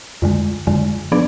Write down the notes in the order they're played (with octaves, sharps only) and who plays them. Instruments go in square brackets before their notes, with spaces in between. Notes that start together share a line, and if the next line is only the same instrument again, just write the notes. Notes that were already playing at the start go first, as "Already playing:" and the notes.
[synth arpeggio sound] F2 D3 G#3
F2 D3 G#3
F3 B3 D4 G#4 D5